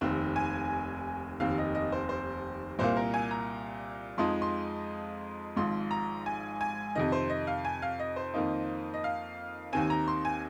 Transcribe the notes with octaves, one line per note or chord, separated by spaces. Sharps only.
F1 D#2 D#3 C4
G#5
F1 D#2 D#3 C4 F5
D#5
D#5
C5
C5
C2 A#2 A#3 C5
A#4
G#5
A#5
F2 F3 G#3 D#4 C6
C6
G#1 G#2 F3 C6
A#5
G#5
G#5
F2 C3 D#3 D#5
C5
D#5
F5
G#5
F5
D#5
C5
F2 D#3 A#3 D#4
D#5
F5
D#2 D#3 C4 G#5
A#5
C6
G#5